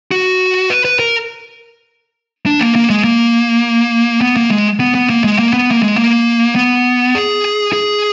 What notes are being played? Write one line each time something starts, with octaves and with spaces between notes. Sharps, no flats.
F#4
B4
B4
A#4
D4
A#3
A#3
G#3
A#3
B3
A#3
G#3
B3
B3
A#3
G#3
A#3
B3
A#3
G#3
A#3
B3
G#4
G#4